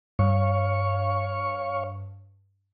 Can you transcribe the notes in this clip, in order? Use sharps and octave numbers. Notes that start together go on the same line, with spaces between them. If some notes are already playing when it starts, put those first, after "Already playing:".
G2 C#5 F5 C#6